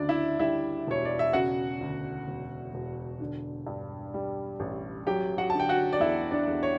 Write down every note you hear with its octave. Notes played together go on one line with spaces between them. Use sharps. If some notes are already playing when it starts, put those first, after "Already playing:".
Already playing: D2 C#3 D4 D5
E4 E5
G3 E4 E5
E1 C#5
D5
E5
C#3 F#4 F#5
D2
E1
E1
D3
G2
G3
A1
F#3 G4 G5
F#4 F#5
D3 A5
G5
F#4 F#5
D5
E2 E4 E5
D4 D5
E2
C#5